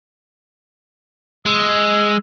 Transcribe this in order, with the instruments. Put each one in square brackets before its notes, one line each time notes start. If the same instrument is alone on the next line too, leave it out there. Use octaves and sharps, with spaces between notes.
[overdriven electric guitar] G#3 [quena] E6